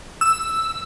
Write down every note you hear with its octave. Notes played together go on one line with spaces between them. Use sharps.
E6